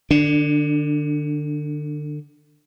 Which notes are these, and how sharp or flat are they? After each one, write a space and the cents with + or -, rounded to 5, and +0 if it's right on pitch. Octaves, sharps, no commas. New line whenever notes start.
D3 +30 D4 +0